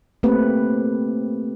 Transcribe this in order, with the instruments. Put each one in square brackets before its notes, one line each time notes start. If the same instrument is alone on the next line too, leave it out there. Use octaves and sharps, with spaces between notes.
[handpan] A3 A#3 C4 G4 B4